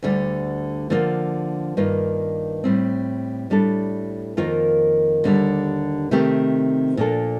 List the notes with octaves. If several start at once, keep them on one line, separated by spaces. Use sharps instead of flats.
D2 D3 G3
D3 F3 A#3 F4
G2 D#3 A#3 F4
A2 G3 C4
A2 G3 D4 A4
F2 D#3 A#3 F4 A#4
D#2 D3 G3
C3 D#3 A3 C4 G4
A#2 F3 A#3 D4 A4